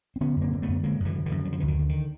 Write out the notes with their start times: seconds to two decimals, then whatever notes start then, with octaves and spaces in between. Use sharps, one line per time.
0.16 C4
0.21 D3 B3 C#4
0.36 F#2
0.42 A#3 C4
0.53 D3
0.62 A3 B3
0.68 F#2
0.84 D3 G#3 A#3
1.00 F#2 D3 E3
1.15 D3
1.26 D3 E3
1.31 F#2
1.45 D3 F#3
1.52 F3
1.60 E3
1.63 D2
1.68 D#3
1.79 D3
1.89 D#3